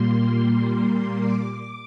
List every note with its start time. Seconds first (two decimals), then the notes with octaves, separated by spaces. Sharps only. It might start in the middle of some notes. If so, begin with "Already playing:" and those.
Already playing: A#2 G3 A#3 C6
1.22 D6